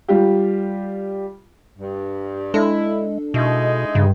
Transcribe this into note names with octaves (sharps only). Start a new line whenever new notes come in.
G3 F4 G4
G2
G#3 D4 E4 A4
B2 G#3 D#4 E4
G2 C#3